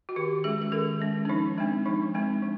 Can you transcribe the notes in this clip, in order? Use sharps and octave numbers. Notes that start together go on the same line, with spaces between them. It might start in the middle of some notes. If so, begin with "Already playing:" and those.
F#4
D#3 G4
G#3 C#4 G#4
G#4
D#3 A4
G#3 C#4
D4
F3 D#4
G#3 C4 D4
F3 D#4
G#3 C4 D4
F3